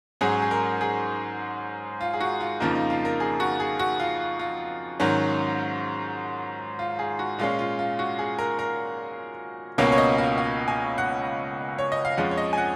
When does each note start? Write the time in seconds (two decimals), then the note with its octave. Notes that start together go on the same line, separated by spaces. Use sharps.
0.21 G#2 F#3 C#4 G#4
0.42 G#4
0.51 A#4
0.81 G#4
2.01 F4
2.13 G#4
2.21 F#4
2.41 F4
2.60 F2 C#3 F3 A#3 D#4
2.75 D#4
2.90 F4
3.05 A#4
3.20 G#4
3.40 F#4
3.60 G#4
3.79 F#4
4.00 F4
4.39 F4
5.00 G#2 D#3 F#3 C#4
6.79 F4
6.99 G#4
7.19 F#4
7.39 A#2 G#3 C#4 F4
7.59 F4
7.79 F4
7.99 F#4
8.19 G#4
8.39 A#4
8.59 A#4
9.78 C#2 B2 A#3 C#4 C#5
9.92 C#5
9.98 D#5
10.18 F5
10.38 F5
10.68 G#5
10.98 F#5
11.79 C#5
11.92 D#5
12.05 F5
12.17 F2 F3 G#3 C#4 F#5
12.31 C#5
12.37 D#5
12.53 G#5
12.58 F#5